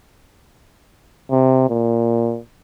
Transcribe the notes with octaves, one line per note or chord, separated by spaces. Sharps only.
C3
A#2